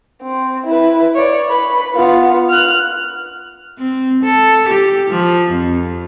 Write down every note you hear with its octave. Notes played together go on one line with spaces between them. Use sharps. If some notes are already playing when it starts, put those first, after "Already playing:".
C4
E4 B4
C#5 D5
B4 B5
B3 F4
F6 F#6
C4
A4
G4
F3
F2